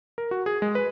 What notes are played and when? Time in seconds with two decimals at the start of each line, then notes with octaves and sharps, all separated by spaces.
0.18 A#4
0.31 F#4
0.46 G#4
0.62 G#3
0.75 B4